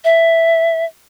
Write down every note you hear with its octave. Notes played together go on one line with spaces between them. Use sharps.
E5